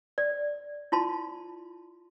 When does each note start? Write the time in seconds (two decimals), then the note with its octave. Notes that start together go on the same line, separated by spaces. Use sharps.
0.18 D5
0.92 E4 F4 A5 C6